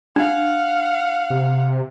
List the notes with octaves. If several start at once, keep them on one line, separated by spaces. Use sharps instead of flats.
D4 F5 F#5
C3